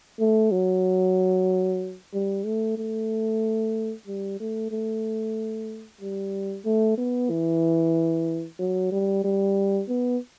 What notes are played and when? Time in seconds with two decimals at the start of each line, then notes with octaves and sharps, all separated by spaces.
0.20 A3
0.52 F#3
2.14 G3
2.46 A3
2.78 A3
4.07 G3
4.40 A3
4.71 A3
6.01 G3
6.65 A3
6.98 B3
7.30 E3
8.59 F#3
8.92 G3
9.24 G3
9.89 B3